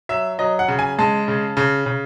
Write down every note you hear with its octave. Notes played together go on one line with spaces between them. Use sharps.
F#3 E5
F#3 D#5
F#5
C#3
G#5
G#3 A5
C#3
C#3
C#3